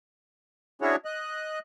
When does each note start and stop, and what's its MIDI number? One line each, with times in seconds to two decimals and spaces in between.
0.82 0.96 61
0.82 0.96 62
0.82 0.96 64
0.82 0.96 66
0.82 0.96 68
0.82 0.96 73
1.05 1.59 75
1.05 1.59 90